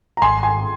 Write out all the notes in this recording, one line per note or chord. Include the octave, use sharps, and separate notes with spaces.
A#5
G#1 G#5 C6
G#5 C6